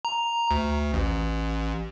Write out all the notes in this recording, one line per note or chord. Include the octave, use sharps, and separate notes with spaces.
A#5
D2
A1